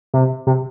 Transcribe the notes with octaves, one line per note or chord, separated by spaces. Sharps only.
C3
C3